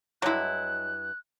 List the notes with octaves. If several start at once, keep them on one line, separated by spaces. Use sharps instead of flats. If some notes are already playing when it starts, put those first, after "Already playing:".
G2 F#3 G#3 E4 F#6